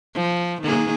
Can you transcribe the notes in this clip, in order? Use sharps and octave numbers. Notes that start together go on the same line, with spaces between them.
F3
D#3 A#3 G#4